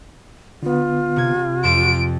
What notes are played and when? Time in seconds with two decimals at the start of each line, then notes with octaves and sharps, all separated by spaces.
0.63 D3 B3 F4
1.16 C3 G#6
1.64 F2 C6 A6 D7 E7